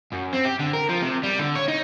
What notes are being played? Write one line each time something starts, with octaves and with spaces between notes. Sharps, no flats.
F#2
C4
G4
D3
A#4
F3
C3
G3
D3
C#5
D#4